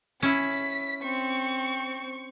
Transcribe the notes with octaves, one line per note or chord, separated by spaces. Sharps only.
C#4 E4 B6
C4 C#6